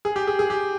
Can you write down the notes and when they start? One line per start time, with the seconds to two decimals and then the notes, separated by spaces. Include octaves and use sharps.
0.05 G#4
0.16 G4
0.27 G#4
0.39 G#4
0.50 G4